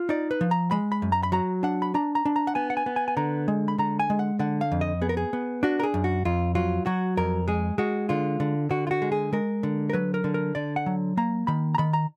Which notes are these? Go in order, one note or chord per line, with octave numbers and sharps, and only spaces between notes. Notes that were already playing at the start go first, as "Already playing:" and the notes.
Already playing: F4
D#4 D5
B4
F3
A#5
G#3 B5
B5
F#2
A#5
B5
F#3 A#5
D4 F#5
B5
D4 A#5
A#5
D4
A#5
F#5
B3 G#5
F#5
G#5
B3
G#5
G#5
D3 A#5
G#3
B5
D3 A#5
G#5
G#3
F#5
D3 F#5
F5
F2
D#5
B3 G#4
A#4
G#4
B3
D4 F#4
A#4
G#4
F#2
F#4
F2 F4
F#3 F4
F#3 F#4
F2 A#4
G#3 G#4
G#3 F#4
D3 F4
D3
D3 F#4
F4
F#4
G#3
G#4
G#3 A#4
D3
A#4
F#3 B4
A#4
D3
A#4
D3 D5
F#5
F#3
A#3 A#5
D#3 B5
A#5
D#3 B5
A#5